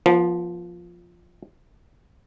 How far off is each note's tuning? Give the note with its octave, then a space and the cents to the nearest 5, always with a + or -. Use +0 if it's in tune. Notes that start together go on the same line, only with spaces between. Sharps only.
F3 +0 B3 -35